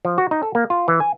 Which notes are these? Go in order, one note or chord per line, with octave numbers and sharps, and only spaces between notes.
F3
F#4
D#4
A4
A#3
F4
E3
G#5